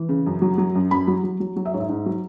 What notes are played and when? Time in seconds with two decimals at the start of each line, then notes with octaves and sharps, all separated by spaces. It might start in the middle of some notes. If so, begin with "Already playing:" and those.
Already playing: E3
0.09 C#3
0.26 F#2
0.42 F#3
0.58 F#3
0.75 F#2
0.91 F#2 B5
1.07 F#3
1.24 F#3
1.40 F#3
1.56 F#3
1.65 E5
1.73 G#2 C#5
1.80 E5
1.89 G#2
2.06 F#3